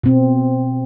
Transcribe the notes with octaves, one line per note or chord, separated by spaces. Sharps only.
B2 C4